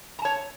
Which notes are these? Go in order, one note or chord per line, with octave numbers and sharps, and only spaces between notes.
C#5 A5 A#5